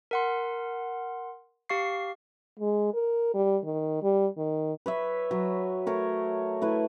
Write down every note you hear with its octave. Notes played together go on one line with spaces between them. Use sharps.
A#4 F#5 C6
G4 F5 C#6 C7
G#3
A#4
G3
D#3
G3
D#3
B4 C#5 E5
F#3
A3 A#4 C#5
A3 E4 B4